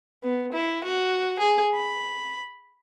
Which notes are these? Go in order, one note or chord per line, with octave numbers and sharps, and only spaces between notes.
B3
E4
F#4
G#4
B5